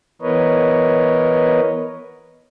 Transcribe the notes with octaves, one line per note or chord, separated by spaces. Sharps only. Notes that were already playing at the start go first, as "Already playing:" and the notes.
E3 B3 A#4 B4 C#5 D#5